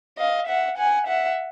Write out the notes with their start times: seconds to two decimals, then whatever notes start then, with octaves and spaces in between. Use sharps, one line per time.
0.19 D#5 F5
0.48 E5 F#5
0.78 F#5 G#5
1.07 E5 F#5